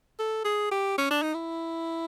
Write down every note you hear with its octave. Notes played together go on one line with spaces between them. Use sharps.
A4
G#4
G4
C#4
D4
D#4
E4